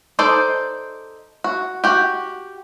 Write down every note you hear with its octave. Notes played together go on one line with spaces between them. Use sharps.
D#4 A4 C5 D5
F#4
F#4 G4